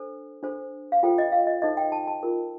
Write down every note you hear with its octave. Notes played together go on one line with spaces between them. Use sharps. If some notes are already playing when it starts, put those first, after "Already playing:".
Already playing: D4 A4 C5
D4 A4 C5
F5
F4 A4 C5 G5
D#5
F5
D#5
D#4 A4 C5 D#5
G5
A5
A5
F4 A#4